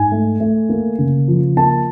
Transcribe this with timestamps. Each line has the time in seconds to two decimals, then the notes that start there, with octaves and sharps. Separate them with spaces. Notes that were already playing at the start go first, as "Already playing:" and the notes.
Already playing: G#2 G#5
0.12 A3
0.40 A3
0.69 A#3
0.98 C#3
1.28 F3
1.57 A#3 A5